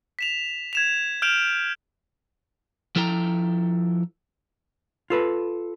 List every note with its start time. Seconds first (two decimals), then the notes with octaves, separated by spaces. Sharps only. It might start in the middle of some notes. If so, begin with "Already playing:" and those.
0.19 B6 E7 F7
0.73 G#6 E7 F7
1.22 F6 G6 D7 E7 F7
2.96 F3 E4 A4 G5 A#5
5.10 F4 A4 B4